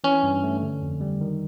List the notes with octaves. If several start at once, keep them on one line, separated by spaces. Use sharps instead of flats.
E3 C#4
G2
A3
D3
F2
G3
D#3